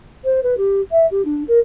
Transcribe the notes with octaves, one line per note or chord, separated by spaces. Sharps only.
C5
B4
G4
E5
G4
D4
A#4